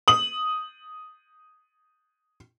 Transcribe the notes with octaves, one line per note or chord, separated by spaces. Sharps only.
D#6 F#7